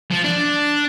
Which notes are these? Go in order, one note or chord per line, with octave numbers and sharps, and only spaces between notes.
F3
D4